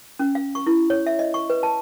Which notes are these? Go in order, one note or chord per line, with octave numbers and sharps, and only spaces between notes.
C#4
F5
C#6
E4
C#5
E5
D#5
C#6
B4
A5